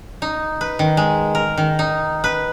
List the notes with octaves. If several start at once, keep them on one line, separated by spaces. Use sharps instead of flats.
D#4
B4
D#3
G#3
A#4
D#3
D#4
B4